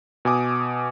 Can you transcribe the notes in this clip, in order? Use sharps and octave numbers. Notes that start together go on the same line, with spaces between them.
B2 G#5 D6 D#6